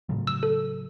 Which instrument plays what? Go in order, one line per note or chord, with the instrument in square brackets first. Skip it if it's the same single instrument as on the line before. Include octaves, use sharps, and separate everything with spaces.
[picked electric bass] A2 C#3 F#3
[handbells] E6
A4